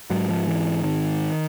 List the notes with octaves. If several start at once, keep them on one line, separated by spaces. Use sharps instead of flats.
G#2 F#3
F3
E3
D#3